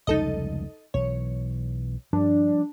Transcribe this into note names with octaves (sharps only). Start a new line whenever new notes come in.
F1 C#2 G3 D#4 A4 D#5
B1 E3 C#5
G2 F3 G3 D4